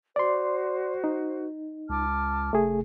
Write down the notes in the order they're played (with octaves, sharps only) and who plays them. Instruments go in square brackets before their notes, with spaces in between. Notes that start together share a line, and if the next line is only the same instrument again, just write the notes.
[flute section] F#4 C5 [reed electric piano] D5 C6
[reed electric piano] D#4
[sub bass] C#2 [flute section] A5 D6 F6
[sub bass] F1 [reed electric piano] A3 G#4